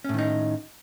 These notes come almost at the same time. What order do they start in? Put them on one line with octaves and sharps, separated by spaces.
C#4 A2 D#3 D#4